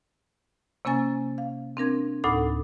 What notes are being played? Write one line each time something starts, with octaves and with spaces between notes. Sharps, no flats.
C3 A#3 C#4 G#5 A6
F5
C4 D4 A#4 G#6
D2 A2 D#4 A4 B5 D6